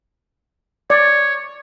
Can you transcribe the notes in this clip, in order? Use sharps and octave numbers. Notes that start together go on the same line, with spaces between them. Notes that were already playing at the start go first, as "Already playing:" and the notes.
C#5 D5